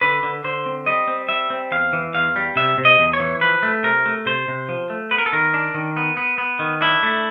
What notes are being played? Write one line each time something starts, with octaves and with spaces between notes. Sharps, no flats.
D3 B4
D3
D3 C5
C4
G3 D#5
C4
G3 E5
C4
E2 F5
E3
E2 F5
G3
C3 E5
C3
D#5
E2
C#5
E3
F3 B4
A3
C3 A#4
A3
C3 C5
C3
F3
A3
B3 B4
A#4
A4
D#3 A#4
D4
D#3
B3
B3
B3
D#3
D4 E4
A3